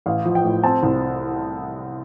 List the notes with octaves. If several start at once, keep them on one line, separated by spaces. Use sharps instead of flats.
A1 F5
F3
G5
A2
C4 A5
C2